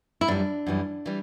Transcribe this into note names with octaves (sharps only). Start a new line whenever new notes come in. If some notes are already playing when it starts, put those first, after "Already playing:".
E4
F#2 E3 G3 D4
F#2 E3 G3
E3 G3